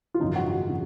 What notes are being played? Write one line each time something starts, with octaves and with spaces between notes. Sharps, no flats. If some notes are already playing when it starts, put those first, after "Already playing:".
F4
G#1 F#2 C#3 F3 D#4
F#4
F#4
C#3 F3